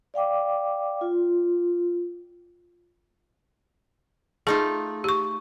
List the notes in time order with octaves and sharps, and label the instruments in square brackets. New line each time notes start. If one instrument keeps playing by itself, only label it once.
[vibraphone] D5 F5 G5 D6
F4
[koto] A3 D#4 F4 [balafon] G#4
[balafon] G4 C#6